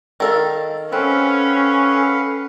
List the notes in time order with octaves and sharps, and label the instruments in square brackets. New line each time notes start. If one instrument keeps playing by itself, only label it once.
[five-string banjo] D#3 A4 F5
[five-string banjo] C4 [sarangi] C#4 [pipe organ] A4 [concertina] B4 F5 F#5